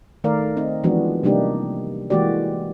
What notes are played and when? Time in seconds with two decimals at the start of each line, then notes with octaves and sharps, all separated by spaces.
0.24 D#3 A3 A#4 D5 F5
0.57 C4 D#4
0.84 E3 F3 G#3 B3 D4 F#4
1.23 C3 G3 A#3 D4 D#4 G4
2.10 E3 G#3 A#3 F#4 G4 D5